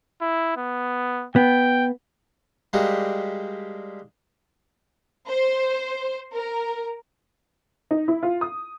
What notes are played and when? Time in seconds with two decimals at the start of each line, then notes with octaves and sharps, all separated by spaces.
0.21 E4
0.57 B3
1.36 B3 G5
2.73 G3 G#3 A#3 D4 F#4 G4
5.28 C5
6.34 A#4
7.91 D#4
8.08 E4
8.23 F4
8.41 D#6